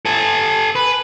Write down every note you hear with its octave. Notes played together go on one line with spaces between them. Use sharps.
A4 G#5
B4